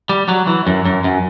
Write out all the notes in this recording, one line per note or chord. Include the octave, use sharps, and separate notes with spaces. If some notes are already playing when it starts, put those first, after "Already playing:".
G3
F#3
E3
F#2
F#2
F#2